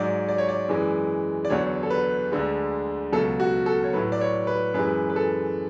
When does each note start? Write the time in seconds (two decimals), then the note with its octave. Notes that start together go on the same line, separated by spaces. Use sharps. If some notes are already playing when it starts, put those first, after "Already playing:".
Already playing: G#2 F#3 D5
0.28 D5
0.38 C#5
0.49 D5
0.69 F#2 E3 G#3
1.45 D5
1.50 E2 D3 F#3 C#5
1.83 A4
1.90 B4
2.32 D2 D3 G#3
3.12 C#2 B2 F#3 A4
3.40 F#4
3.66 A4
3.84 C#5
3.93 A2 F#3 B4
4.12 D5
4.21 C#5
4.47 B4
4.74 F#2 E3 G#3 B4
5.09 B4
5.16 A4